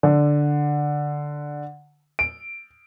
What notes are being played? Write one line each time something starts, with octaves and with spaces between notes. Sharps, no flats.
D3
D7